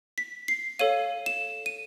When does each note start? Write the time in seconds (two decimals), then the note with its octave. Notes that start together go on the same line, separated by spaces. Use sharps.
0.18 B6
0.48 C7
0.79 A4 C#5 F5 D#7
1.26 E7
1.66 D#7